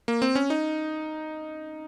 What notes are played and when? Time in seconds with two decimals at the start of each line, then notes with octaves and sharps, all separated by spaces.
0.08 A#3
0.22 C4
0.35 C#4
0.50 D#4